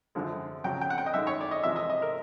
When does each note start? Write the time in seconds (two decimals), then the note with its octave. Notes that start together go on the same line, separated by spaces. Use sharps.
0.15 F#2 D3 F3 G#3
0.64 F2 C#3 F#3 G5
0.81 G5
0.90 F#5
0.98 G5
1.06 D#5
1.14 F#2 D#3 G#3 E5
1.27 C#5
1.41 D5
1.51 D#5
1.63 E2 C3 F3 G#3 E5
1.76 D#5
1.90 D#5
2.02 A#4